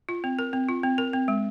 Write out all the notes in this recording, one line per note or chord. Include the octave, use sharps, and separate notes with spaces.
F4
C4
A#4
C4
F4
C4
A#4
C4
G#3